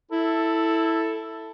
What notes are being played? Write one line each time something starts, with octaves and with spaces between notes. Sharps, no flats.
E4 A4